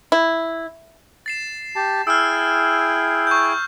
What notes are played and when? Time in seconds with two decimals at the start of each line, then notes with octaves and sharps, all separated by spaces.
0.12 E4
1.26 A6 C7 E7
1.76 G4 A5
2.07 E4 G#4 G5 E6 F6
3.27 C#6 G6